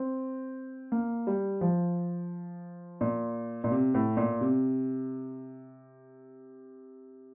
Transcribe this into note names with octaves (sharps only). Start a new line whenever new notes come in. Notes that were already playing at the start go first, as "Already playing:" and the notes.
Already playing: C4
A#3
G3
F3
A#2
A#2
C3
A2
A#2
C3